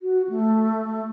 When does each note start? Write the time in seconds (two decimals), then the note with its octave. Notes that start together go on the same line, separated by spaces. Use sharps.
0.01 F#4
0.29 A3